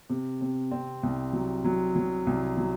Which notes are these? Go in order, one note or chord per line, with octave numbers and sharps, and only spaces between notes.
C3
C3
C4
C2
F#3
F#3
F#3
C2
F#3